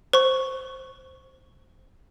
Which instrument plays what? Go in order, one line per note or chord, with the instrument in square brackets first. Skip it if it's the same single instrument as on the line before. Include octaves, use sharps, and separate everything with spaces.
[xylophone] C5 C#6